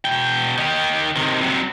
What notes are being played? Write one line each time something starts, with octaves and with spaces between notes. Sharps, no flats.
B2 G5
D#3 G4
C3 D#3
C3 F#3